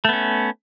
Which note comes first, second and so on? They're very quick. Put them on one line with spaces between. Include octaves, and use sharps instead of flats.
A3 B3 C#4